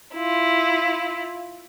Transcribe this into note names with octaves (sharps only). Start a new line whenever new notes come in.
E4 F4